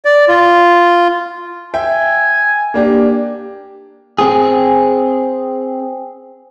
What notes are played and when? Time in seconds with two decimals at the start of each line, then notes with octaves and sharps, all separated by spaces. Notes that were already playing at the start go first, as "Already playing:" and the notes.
0.05 D5
0.28 F4
1.74 E5 G5 G#5
2.74 A#3 D4 G4
4.19 C4 G#4